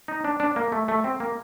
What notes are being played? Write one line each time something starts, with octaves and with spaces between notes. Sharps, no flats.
D#4
D4
D4
A#3
A3
A3
C4
A#3